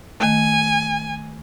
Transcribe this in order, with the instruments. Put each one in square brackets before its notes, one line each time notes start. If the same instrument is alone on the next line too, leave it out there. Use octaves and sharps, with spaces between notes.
[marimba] D#3 A3 [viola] G#5